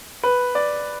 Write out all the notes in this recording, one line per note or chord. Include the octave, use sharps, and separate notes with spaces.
B4
D5